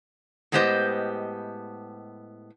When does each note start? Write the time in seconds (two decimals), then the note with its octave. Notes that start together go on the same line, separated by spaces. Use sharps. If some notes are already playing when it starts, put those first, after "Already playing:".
0.52 A2 G#3 B3 G4 C5 D#5